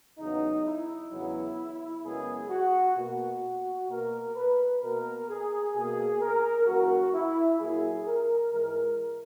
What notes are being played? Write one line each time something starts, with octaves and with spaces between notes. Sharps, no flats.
E2 C#3 F#3 B3 D#4
E4
E2 C#3 F#3 B3
F#2 C#3 G#3 B3 G#4
F#4
B2 A#3 F#4
B2 A#3 A#4
B4
B2 A#3 A#4
G#4
B2 A#3 G#4
A#4
F#2 E3 A#3 F#4
E4
A#2 F#3 A#3 G#4
A#4
G#2 E3 G#3 A#4